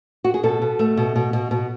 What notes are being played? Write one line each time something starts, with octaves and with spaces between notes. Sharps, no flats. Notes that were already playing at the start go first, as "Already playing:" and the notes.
F#4
G#4
B2 A4
B2
A3
B2
B2
B2
B2